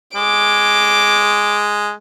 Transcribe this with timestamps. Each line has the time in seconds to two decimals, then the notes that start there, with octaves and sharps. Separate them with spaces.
0.15 G#3 D6